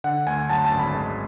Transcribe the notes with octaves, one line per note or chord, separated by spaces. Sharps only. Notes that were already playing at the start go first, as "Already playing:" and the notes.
D3 F#5
D2 G#5
F#2 A5
A5
G#1
B5
G#3